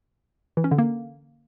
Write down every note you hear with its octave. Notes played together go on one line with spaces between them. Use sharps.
E3
C#4
D3
A#3